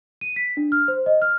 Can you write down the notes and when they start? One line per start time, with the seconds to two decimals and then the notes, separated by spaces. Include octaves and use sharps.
0.21 D#7
0.36 B6
0.57 D4
0.72 F6
0.88 C5
1.06 D#5
1.22 F6